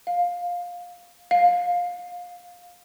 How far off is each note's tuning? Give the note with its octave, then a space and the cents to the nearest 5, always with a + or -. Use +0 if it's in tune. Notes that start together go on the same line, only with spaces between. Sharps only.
F5 +15
F5 +20